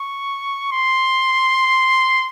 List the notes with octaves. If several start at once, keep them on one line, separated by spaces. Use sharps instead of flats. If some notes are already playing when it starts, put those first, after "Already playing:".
Already playing: C#6
C6